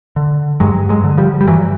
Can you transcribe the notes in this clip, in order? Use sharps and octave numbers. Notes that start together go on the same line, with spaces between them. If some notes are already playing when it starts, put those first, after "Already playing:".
D3
G2 F#3 G#3
F#3 G#3
D3
F3 G3
G3
G2 E3 F#3